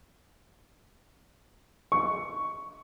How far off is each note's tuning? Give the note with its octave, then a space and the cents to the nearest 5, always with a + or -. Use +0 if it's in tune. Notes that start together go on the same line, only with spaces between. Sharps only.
C#6 +5